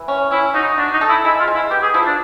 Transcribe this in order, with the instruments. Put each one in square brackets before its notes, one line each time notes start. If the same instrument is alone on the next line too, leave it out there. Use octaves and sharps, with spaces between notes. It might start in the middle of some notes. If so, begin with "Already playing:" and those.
Already playing: [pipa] E3
C#4
[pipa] C#4 [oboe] E4
[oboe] D#4 [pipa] F#4
[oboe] D4 [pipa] F#4
[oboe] D#4
[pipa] A4
[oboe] E4
[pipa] G#3 [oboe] E4
[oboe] F4
[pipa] G#3
[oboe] E4
[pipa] B3 [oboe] G4
[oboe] G#4
[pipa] F3 [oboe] E4
[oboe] D4